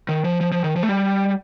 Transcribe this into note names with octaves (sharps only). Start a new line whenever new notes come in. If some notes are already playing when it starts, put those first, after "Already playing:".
D#3
F3
F3
F3
D#3
F3
A3
G3